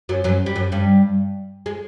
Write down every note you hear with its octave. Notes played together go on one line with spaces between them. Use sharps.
F#2 F#3
F#2 F#3
G3
F#2 F#3
G2 G3
G#3